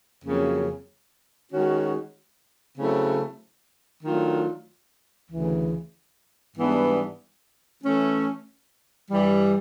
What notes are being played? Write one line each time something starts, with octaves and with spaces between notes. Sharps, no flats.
F2 C#3 F#3 A#3 C#4
D#3 G#3 C#4 F#4
C#3 F#3 A3 C4 E4
D#3 F#3 A3 D4 F4
D2 C#3 E3
G#2 E3 G3 B3 D4
E3 A3 C#4
G2 E3 G3